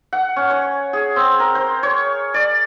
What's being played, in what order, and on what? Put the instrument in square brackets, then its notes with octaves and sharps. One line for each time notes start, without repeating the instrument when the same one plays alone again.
[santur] F#5
C#4
C#5
G#4
C4
A#4
C5
C#5
D5